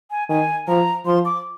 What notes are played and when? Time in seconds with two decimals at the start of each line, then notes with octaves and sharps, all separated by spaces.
0.11 G#5
0.29 D#3 G#5
0.68 F3 A#5
1.06 F3 C6
1.25 D6